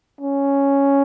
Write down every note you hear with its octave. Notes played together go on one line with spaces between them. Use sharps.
C#4